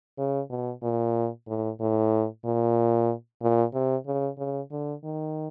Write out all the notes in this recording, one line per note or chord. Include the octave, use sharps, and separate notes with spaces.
C#3
B2
A#2
A2
A2
A#2
A#2
C3
C#3
C#3
D3
D#3